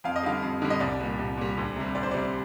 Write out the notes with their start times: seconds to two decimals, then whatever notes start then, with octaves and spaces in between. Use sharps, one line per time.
0.04 F2 F5
0.16 D#5
0.23 D3 G3 F5
0.42 F2
0.62 D3 G3
0.70 D#5
0.80 C2 D5
1.00 A#2 G3
1.18 C2
1.37 A#2 G3
1.58 D2
1.76 C3 G3
1.95 D2 D5
2.03 C5
2.11 C3 G3 D5